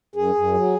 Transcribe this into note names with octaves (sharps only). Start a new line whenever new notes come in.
F#2 G#4
F#2
F#3